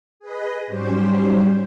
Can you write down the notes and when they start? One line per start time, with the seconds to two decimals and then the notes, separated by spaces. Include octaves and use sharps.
0.20 G#4 B4 D#5
0.67 G#2 F#3 G3 C#4 G4 C5